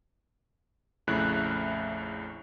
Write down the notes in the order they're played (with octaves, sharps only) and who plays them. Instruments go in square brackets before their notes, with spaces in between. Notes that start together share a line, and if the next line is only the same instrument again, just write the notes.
[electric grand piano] A#1 F2 C#3 A3 E4 F#6